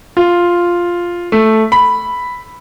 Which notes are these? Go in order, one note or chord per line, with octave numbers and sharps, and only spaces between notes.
F4
A3
B5